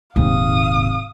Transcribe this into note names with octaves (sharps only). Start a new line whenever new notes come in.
D#1 D#2 G#2 C3 C4 F5 D#6